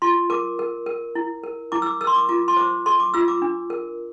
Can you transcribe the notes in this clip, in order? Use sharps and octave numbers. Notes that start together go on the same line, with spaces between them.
F4 C6
A#4 D6
A#4
A#4
E4
A#4
E4 D6
E6
D6
A#4 E6
C6
D6
F4 D6
C6
C5 D6
A4 C6
D6
F4 E6
D6
D4
A#4